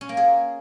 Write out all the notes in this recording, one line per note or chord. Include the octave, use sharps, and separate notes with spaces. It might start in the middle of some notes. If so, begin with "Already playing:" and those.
C#4
A#3
G#4